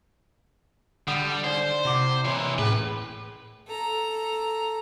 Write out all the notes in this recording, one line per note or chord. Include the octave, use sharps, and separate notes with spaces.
D3 G3 F#5 B5 D#6
D#4 C5 D5
C3 E4 F#5 D6
E3 A#3 C#5 C6
A2 C#4 G#4 B4
A4 A#5